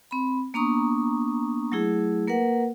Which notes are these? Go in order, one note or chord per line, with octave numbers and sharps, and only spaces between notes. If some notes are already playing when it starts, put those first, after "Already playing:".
C4 B5
A#3 B3 D4 A#5 C#6 D#6
F#3 A3 E4 G#4
A#3 A#4 B4 F#5